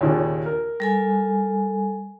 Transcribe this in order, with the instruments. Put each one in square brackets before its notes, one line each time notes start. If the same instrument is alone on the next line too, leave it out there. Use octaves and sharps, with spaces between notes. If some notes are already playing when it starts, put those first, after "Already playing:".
[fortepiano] D#2 A#2 C#3
A#4
[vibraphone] G3 A4 G#5